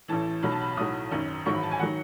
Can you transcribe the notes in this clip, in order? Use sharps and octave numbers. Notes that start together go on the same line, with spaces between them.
A1 A2 E3 A5
B1 B2 F#3 B5
A5
B5
B1 A2 F#3 D#6
G#1 F#2 D#3
A1 G#2 D#3 F#3 C#6
B5
A5
G#5
D#3 F#3 F#5